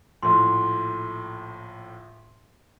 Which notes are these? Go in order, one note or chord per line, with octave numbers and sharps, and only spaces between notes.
A#1 A2 C6